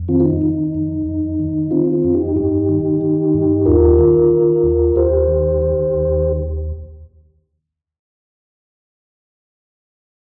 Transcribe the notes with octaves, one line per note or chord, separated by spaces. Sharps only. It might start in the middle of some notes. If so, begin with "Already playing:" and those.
Already playing: F2
D#3 C4 F4
F4
D#4
D#3
F2
F2
D#3
D#3 C4 F4
C4 F4
F2
D#4 G4
G2 D#4 G4
D#3
D#3
G2
D#2 F4 A#4
D#3
D#3
D#2
D#2 G4 C5
D#3
D#3
D#2